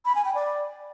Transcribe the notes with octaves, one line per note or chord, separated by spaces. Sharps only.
B5
G#5
G5
D5